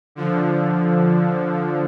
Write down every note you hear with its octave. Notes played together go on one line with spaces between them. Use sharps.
D3 F3